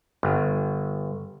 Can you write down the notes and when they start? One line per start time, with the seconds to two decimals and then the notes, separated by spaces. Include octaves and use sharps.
0.23 G1